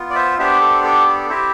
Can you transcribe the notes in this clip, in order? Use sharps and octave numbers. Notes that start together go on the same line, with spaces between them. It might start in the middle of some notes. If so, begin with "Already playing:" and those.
Already playing: B3 F4
D5
C5 E5
B3 D4 G4 C5 E5
A4 C5
A4
A4
C4 E4 G4 C5 E5